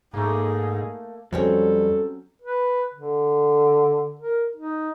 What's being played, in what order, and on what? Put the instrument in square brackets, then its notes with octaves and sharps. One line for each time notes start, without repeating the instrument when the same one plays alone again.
[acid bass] G#2 [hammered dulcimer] A3 A#3 [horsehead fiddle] D#4 G#4
[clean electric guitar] F2 [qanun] F#3 C4 C#4 [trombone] G3 [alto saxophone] A4
[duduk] B4
D3
A#4
D#4